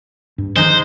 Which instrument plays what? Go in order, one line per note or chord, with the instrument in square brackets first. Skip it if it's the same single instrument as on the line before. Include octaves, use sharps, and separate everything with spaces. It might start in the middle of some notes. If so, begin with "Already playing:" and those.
[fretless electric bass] G2
[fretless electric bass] C2 D#3 F3 [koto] G#3 D#4 [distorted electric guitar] C5